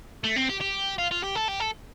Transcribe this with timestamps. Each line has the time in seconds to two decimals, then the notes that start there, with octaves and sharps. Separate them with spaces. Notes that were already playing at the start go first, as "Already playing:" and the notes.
0.24 A3
0.36 C4
0.49 G4
0.61 G4
0.98 F4
1.11 F4
1.23 G4
1.36 A4
1.48 G4
1.60 A4